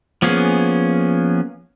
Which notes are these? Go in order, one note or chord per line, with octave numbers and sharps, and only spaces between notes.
F3 A#3 B3 C#4 G#4